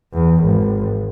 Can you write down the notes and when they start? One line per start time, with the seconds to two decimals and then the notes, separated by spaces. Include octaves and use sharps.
0.14 E2
0.44 G#1